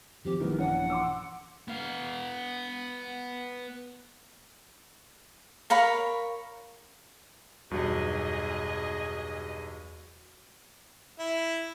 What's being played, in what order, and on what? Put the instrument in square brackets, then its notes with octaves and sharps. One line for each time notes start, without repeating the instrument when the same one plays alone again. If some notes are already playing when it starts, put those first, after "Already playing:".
[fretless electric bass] D#3 F3 C4 [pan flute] G4
[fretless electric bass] A#1 E3 [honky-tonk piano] D#3 G3 B3 [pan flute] A#4
[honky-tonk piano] G2 C#4 D4 [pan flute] F#5
[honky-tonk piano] C6 D6 E6
[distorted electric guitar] B3 F5
[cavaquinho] A#4 C#5 F5 B5
[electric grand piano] B1 G2 [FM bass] E2 [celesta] F#4 [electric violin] G#4 D#5
[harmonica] E4